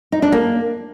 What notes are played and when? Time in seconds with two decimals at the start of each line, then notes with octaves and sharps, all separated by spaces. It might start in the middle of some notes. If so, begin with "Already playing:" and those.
0.12 D#4
0.22 D4
0.32 A#3